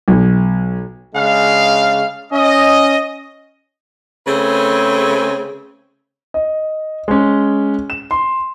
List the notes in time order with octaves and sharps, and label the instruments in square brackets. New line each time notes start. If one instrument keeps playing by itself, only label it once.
[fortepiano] B1
[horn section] C#3 G#3 D4 F5
C#4 D#5
[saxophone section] C#3 A3 C4 G#4 B4
[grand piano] D#5
G#3 C#4
E7
C6